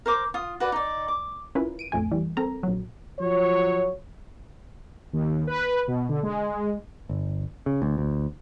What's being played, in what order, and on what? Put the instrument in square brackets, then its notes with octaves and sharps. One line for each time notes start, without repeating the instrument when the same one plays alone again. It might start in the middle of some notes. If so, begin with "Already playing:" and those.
[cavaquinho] A#4 C5 D6
F4 D#6
F#4 B4 D5
D#4 D5
D6
[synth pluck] C#4 E4 F4 A#4 B4
D7 D#7
A#1 F2 A3 G#5
E3 G3
C4 A4 A#4 A#5
A#1 F#3
[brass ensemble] F3 F#3 C#5
[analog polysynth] D#2
B4
B2
D3
G#3
[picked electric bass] G1
C#3
D2
D2